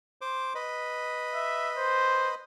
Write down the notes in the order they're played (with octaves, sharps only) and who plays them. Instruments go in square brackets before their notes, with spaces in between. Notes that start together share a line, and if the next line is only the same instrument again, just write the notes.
[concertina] C5 D6
B4 D#5
[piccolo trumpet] E5
C5